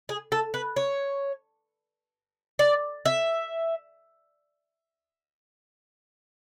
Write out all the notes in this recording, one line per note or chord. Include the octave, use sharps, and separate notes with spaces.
G#4
A4
B4
C#5
D5
E5